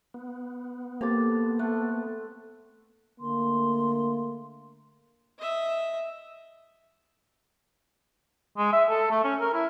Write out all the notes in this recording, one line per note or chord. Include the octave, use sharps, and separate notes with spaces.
B3
A#3 C4 G4 A4 D6 A6
A3 F#5 F#6
D3 A3 A#3 C6
D#5 E5
G#3
E5
A4
A3
C#4
A#4
E4